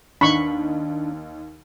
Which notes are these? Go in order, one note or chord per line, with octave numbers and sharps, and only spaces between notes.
D#2 D4 D#4 B5 C#6